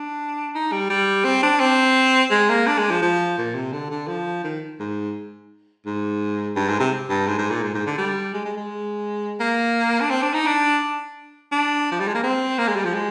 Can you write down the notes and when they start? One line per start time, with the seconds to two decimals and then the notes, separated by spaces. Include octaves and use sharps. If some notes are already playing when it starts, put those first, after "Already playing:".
Already playing: D4
0.55 D#4
0.72 G3
0.90 G3
1.25 C4
1.43 D4
1.60 C4
2.31 G#3
2.49 A#3
2.67 D4
2.78 G#3
2.90 F3
3.02 F3
3.38 A#2
3.55 C3
3.73 D3
3.91 D3
4.08 F3
4.44 D#3
4.80 G#2
5.86 G#2
6.56 G2
6.68 G#2
6.80 C3
7.09 G2
7.27 G#2
7.39 G#2
7.50 A#2
7.63 G#2
7.75 G#2
7.86 D3
7.98 G3
8.34 G#3
8.45 G#3
8.57 G#3
9.40 A#3
10.01 D4
10.11 C4
10.23 D4
10.34 D#4
10.47 D4
11.52 D4
11.92 F3
12.00 G3
12.08 G#3
12.15 A#3
12.23 C4
12.58 A#3
12.68 G#3
12.76 G3
12.85 F3
12.95 G#3